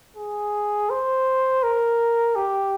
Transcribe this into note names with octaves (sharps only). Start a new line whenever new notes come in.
G#4
C5
A#4
G4